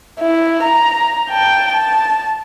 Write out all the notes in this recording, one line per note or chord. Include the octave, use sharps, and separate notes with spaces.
E4
A#5
G5 A5
A5